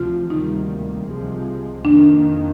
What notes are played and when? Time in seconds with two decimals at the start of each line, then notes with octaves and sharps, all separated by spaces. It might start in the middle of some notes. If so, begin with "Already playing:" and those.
Already playing: D2 C3 F3 F4
0.30 D2 C3 D#3 G3 A#3 D#4
1.08 C2 C3 F3 G#3
1.85 F2 D#3 A#3 D4